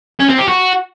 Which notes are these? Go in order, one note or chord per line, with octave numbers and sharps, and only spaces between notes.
C#4
C4
G4
F#4